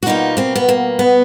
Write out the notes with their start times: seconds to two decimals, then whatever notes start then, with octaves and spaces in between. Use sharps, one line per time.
0.03 F#4
0.06 B2 G3 A#3 D#4 F4
0.37 A#3 C4
0.56 B3
0.69 A#3
0.99 B3